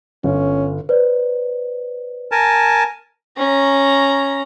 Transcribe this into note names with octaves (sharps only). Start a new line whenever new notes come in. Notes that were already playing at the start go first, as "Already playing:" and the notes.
G1 C#4
B4 C5 D5
A#4 G#5 A5
C#4 A#5